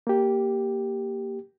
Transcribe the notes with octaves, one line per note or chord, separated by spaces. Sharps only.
A#3 G4